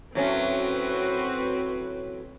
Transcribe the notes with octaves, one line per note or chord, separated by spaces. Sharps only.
A2 F#3 C4 C#4 F#4 B4